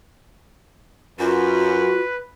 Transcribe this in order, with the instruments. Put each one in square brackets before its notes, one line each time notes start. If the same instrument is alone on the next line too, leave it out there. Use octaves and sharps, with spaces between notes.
[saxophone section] F#2 [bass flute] F4 [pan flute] F#4 [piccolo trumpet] B4